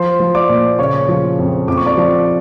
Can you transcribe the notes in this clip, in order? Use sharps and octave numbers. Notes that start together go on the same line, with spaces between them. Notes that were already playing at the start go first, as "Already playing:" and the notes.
Already playing: F3 C5 C6
F3
D5 D6
A#2
C#3 C#5 C#6
F3
F2
F2 D6
C#6
D5 D6
F3